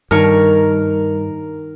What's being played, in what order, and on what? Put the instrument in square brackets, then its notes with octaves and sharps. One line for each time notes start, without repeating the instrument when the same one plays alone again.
[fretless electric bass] G2 [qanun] D#3 C#5 C#6 [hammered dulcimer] A#4